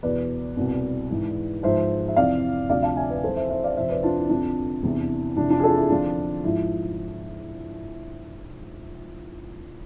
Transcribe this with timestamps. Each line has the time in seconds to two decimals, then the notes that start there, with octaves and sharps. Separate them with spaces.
0.03 E2 B2 B4 D5
0.57 C2 B2
1.10 G#2 E3
1.63 G#2 F3 C5 E5
2.08 E5
2.16 F2 C3 E3 D5 F5
2.69 D2 C3 F3 D5 F5
2.83 F5 A5
2.97 E5 G#5
3.10 B4 D5
3.23 F2 E3 A4 C5
3.36 C5 E5
3.49 C5 E5
3.63 D5 F5
3.77 F2 C3 F3 C5 E5
3.89 B4 D5
4.03 D4 F4
4.17 E4
4.29 F2 D3 F3 D4
4.83 E2 C3 E3
5.36 F2 C3 E3 D4
5.50 D4 F4
5.60 G#4
5.64 F4 A4
5.76 E4 G#4
5.90 F2 D3 F3 D4 F4
6.44 G#2 F3 E4